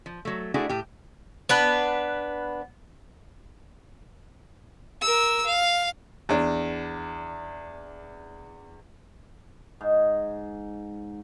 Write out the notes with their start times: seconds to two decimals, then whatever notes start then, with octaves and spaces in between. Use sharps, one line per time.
0.06 F3
0.25 F#3 A3
0.54 A3 D4 E4 F#4 G#4
0.69 A2 G4
1.49 B3 D4 B4
5.01 A#4 E6
5.46 F5
6.29 E2 D4
9.81 G#2